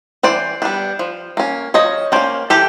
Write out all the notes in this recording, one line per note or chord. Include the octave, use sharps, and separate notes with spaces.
E3 C5 D5
G3 B3 D4
F3
A#3 C#4
F3 C#5 D#5
A#3 C#4 C5 D5
E3 G4 A4